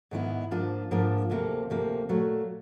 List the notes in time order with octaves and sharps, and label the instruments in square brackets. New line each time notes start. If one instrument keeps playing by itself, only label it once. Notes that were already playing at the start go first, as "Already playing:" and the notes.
[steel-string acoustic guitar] G#2 D#3 G#3 B3 E4
G#2 F3 A#3 D4 F4
G#2 F3 A#3 D4 F4
D2 C3 F3 A#3
D2 C3 F3 A#3
A#2 F#3 A3